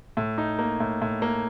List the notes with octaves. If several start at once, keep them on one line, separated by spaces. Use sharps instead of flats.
A2
D#4
A#3
A2
A2
A#3